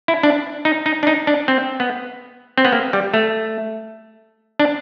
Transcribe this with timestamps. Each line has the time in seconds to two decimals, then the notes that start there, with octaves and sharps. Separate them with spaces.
0.08 E4
0.23 D4
0.65 D#4
0.86 D#4
1.03 D4
1.07 D#4
1.27 D4
1.48 C4
1.80 B3
2.58 C4
2.65 B3
2.73 A#3
2.93 G3
3.14 A3
4.60 D4